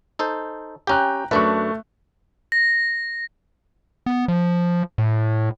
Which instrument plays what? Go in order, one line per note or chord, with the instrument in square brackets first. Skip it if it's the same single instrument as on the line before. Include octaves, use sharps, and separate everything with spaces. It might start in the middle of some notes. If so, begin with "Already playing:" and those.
[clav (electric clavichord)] D#4 A4 C5
[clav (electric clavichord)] C#4 G4 [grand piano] G5 A#5 F#6
[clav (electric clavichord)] F#2 D4 B4 [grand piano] A3 C#6
[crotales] A#6
[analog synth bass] B3
F3
A2